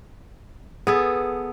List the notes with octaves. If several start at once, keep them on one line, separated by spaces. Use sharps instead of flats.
B3 G#4 A4